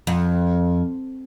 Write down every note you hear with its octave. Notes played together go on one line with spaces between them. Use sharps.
F2